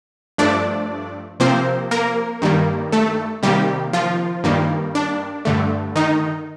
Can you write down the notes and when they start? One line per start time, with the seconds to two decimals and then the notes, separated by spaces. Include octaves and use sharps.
0.38 G2 F3 A3 D4 D5
1.40 C3 F3 A#3 C4 C5
1.91 A#3 A#4
2.42 G2 D#3 G3 A#3
2.92 A3 A4
3.43 C3 D#3 G3 A#3 G4
3.93 F3 F4
4.44 G2 D#3 G3 A#3
4.95 D4
5.45 G2 D3 A3
5.96 D#3 D#4